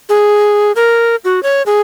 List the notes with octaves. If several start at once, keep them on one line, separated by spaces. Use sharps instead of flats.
G#4
A#4
F#4
C#5
G#4